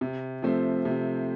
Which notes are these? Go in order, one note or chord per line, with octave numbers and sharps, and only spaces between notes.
C3
F3 A3 C4
C3